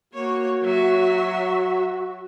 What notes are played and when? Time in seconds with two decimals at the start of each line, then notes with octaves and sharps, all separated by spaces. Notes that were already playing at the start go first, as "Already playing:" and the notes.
0.13 A#3 F#4 C#5
0.62 F#3 E5